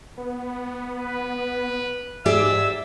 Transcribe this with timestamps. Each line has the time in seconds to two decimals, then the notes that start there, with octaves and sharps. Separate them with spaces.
0.17 B3
0.97 B4
2.26 G#2 G4 G#4 D5 E5 E6